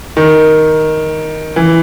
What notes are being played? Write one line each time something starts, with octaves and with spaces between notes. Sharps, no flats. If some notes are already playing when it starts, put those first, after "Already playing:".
D#3
E3